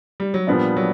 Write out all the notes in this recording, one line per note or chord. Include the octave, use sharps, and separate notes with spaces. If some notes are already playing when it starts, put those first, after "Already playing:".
G3
F#3
A#2 F3 G3 B3 D4
F#3